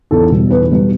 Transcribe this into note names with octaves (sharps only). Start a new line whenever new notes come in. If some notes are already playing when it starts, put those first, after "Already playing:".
E2 A4
B2 G3
E2 B4
B2 G3